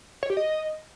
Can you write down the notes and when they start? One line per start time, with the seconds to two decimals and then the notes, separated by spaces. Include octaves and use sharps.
0.23 C#5
0.30 G4
0.37 D#5